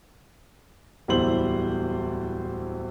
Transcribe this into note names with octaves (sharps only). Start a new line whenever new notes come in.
D1 E2 G3 E4 C5 F#7